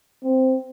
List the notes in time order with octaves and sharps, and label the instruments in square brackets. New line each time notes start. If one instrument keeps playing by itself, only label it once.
[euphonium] C4